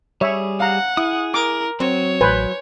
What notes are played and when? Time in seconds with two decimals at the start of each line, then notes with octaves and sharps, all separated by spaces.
0.21 G3 G#4 C#5 E5
0.60 F5 F#5 A#5
0.97 E4 G#4 D#6
1.34 A#4 D6
1.80 F#3 C4 C#5
2.21 A1 B4 C5 G#5